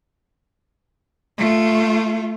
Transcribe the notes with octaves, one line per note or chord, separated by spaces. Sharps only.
A3 F4